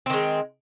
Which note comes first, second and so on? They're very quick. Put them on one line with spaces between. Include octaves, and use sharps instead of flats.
C4 D#3 G#3